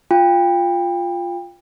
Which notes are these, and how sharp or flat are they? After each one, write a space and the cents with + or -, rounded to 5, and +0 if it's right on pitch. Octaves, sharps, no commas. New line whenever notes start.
F4 +0 G5 +25